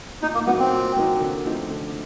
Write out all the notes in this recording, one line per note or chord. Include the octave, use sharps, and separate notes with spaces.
A#2 D#4
A#3
F#3 A#3 B3 D#4 F#4
C4
A#2
F#3 A#3 D#4 F#4
D3
F3 A3 C4 D#4
D3